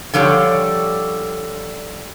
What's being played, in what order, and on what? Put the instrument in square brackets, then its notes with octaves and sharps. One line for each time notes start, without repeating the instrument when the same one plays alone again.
[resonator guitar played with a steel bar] D3 F3 G3 C#5